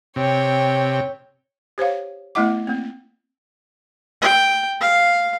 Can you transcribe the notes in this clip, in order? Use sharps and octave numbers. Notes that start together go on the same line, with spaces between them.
C3 C#5 G5
G4 C5 C#5 F5
A3 B3 E4 D#5 F#5 D6
A#3 C4
G5
F5